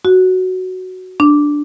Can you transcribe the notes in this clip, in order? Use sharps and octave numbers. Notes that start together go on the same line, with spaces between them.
F#4
D4